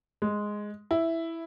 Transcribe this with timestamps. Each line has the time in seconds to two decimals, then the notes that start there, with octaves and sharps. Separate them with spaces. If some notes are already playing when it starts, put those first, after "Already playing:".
0.22 G#3
0.91 E4